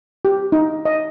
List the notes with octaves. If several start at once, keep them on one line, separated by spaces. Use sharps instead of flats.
G4
D#4
D#5